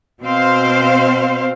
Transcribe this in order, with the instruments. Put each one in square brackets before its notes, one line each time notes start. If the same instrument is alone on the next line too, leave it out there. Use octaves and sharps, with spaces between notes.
[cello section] B2 C4 C5 F5